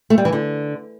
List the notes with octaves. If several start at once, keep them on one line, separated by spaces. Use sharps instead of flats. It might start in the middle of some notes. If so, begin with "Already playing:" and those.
A3
G3
E3
D3